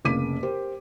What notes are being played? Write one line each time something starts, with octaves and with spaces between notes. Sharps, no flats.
F1 C#3 A#3 D6 B6 D#7
G4 A#4 C5